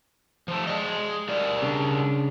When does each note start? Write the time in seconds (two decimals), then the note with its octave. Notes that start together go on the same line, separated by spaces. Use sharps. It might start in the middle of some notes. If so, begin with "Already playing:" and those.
0.48 F3 A3
0.67 G#4 D5 D#5
1.28 G3 A#4 D5
1.62 C#3 D4